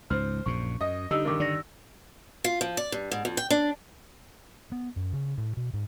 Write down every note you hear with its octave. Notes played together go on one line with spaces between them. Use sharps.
C#2 G#2 C5 F6
A#1 F#2 A#2 C#6
F#2 D#5
D3 G3 D#4 E6
G2 D#3 A#4 D6
D3 D5 A#6
F4
F3
D5
G2
G#2
F2
G5
D4
B3
F#2
C#3
A2
B2
G#2